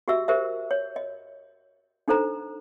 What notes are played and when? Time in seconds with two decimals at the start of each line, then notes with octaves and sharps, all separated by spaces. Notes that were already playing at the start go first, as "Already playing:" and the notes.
0.08 F#4 G4 D#5 E5 E6
0.28 G4 A#4 C5 D#5 E5
0.71 C#5
0.96 D#5
2.08 D4 D#4 A4 C5 A#5